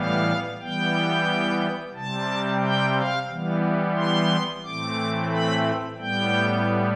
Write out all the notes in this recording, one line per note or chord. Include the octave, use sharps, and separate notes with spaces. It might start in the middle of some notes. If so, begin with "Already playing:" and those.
Already playing: A2 E3 G3 B3 F5
E3 G3 B3 G5
C3 G3 C4 A5
G5
F5
E3 G3 B3
C6
A2 E3 A3 C4 D6
B5
A2 G3 B3 G5